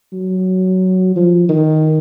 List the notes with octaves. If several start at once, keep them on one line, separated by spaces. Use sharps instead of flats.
F#3
F3
D#3